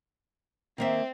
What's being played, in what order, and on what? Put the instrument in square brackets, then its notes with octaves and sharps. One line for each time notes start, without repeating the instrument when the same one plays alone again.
[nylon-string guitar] D#3 A#3 E5 [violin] C4